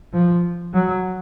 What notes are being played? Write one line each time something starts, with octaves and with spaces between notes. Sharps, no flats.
F3
F#3